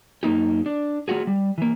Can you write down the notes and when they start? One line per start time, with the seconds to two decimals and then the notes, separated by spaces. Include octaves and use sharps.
0.23 F#2 A#3 D#4 G4
0.66 D4
1.08 A3 F4 F#4 G#4
1.27 G3
1.58 E3 A#3